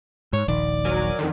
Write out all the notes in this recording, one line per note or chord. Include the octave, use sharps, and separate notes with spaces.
G#2 C#5
D#1 A#1 D#3 D5
F#3 A#4 G#5
F2 D3 D#3